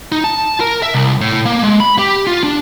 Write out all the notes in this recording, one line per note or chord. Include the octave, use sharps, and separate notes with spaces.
D#4
A5
A#4
E5
C2
A2
A#3
G#3
B5
G4
F4
D4